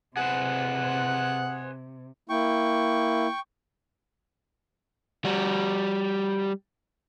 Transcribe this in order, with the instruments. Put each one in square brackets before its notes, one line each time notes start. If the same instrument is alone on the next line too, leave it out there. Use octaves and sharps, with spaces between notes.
[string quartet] C3 [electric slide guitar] G#4 B4 C5 [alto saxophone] F#5
[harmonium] A#3 E4 [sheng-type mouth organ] G5 C#6
[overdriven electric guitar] G3 F#4